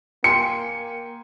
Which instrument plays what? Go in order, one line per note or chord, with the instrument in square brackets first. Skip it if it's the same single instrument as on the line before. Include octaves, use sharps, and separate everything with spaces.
[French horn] A#3 [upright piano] G5 G#5 C6 [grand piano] C#7